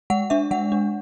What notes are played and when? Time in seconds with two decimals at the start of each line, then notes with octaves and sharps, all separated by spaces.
0.10 G#3 F#5
0.30 D4 E5
0.51 G#3 F#5
0.72 D4